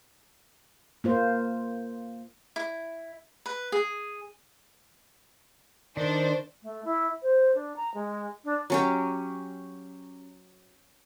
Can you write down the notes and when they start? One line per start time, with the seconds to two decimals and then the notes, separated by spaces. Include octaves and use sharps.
1.04 A#3 F4 C5
2.56 E4
3.46 B4
3.72 G#4
5.97 D#3 D4 C5
6.63 A3
6.84 E4
7.22 C5
7.55 D4
7.76 A#5
7.94 G#3
8.44 D4
8.70 F#3 C#4 G4